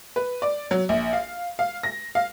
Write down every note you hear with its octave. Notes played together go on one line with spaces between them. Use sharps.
B4
D5
F#3
A#1
F5
F5
A#6
F5